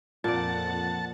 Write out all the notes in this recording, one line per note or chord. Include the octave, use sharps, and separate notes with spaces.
F2 A#2 D5 F#5 A5